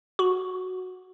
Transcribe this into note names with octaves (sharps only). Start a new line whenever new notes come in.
F#4